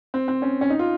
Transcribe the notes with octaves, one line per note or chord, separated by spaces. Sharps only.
C4
C4
C#4
C#4
D#4
F4